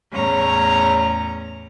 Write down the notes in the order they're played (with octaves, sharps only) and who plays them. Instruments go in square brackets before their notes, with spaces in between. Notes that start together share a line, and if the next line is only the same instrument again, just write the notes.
[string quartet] E2 A2 C#4 C#5 A#5